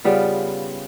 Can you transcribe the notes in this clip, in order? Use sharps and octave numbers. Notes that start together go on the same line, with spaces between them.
C#3 G3 B3 F4